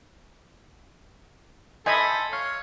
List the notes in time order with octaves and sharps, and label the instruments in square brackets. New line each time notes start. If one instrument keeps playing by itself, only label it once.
[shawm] A4 [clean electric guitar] C5 B5 [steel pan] D#5 E5 G#5
[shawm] C#5 [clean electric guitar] F5